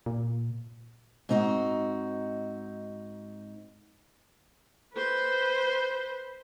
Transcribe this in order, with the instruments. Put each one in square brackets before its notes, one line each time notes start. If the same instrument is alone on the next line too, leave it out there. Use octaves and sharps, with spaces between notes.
[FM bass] A#2
[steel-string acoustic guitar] G#2 C4 D#4 E4 F#4
[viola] B4 C5